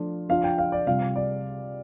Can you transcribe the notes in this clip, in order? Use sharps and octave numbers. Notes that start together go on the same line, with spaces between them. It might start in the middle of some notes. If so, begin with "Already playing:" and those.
Already playing: F3 A3 D4 F4
F3 D4 F4 F5
G5
F5
D5
C3 G3 F4 F5
D5